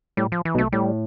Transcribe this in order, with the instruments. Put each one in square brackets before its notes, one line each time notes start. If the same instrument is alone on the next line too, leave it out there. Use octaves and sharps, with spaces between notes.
[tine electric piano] A2 [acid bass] G3
[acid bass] F3
E3
[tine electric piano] B1 B2
[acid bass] A3
[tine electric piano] A2 [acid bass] G3